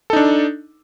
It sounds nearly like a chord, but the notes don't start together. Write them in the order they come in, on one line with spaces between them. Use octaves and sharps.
A4 D#4 D4